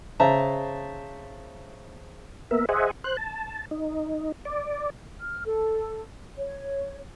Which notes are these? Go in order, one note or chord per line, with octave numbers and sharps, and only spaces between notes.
C#3 C5 E5 A5 A#5
A#3 B3 A#4 E5
G#4 C5 D#5 E5 F#5 G#5
C5 F#6
A5
D#4
D5
F6
A4
C#5